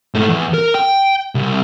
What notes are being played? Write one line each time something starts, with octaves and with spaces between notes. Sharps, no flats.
G#2 A3
E2
A#4
G5
C2